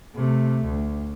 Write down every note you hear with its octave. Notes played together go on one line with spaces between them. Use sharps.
C3 A3
D2